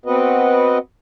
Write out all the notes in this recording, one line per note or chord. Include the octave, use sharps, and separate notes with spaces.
B3 C4 F#4 B4 D#5